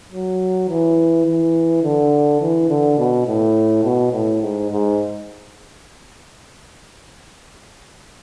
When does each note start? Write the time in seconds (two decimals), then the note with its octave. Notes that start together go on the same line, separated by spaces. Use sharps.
0.12 F#3
0.69 E3
1.26 E3
1.84 D3
2.41 E3
2.70 D3
2.98 B2
3.27 A2
3.84 B2
4.13 A2
4.42 G#2
4.71 G#2